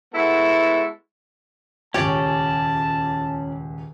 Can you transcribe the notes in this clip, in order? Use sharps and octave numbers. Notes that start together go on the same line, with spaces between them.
G#3 B3 E4 F#4 A4
D#1 C#2 C#4 G4 C#5 D5 A5